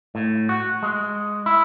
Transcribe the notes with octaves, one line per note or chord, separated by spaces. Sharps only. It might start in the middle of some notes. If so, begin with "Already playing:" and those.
A2
F#4
G#3
E4